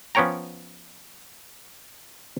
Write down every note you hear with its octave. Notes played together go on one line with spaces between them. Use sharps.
F3 B3 C#4 C#5 G5 A#5